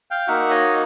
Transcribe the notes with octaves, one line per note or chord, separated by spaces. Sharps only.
F5 G5
A#3 D#4 F#4 E5 F#5
C#5 D#5